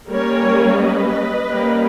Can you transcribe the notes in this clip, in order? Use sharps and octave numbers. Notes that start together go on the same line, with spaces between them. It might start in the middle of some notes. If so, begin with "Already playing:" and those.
G3 A#3 C#4 A#4 C#5
B4 D#5
G3 A#3 C#4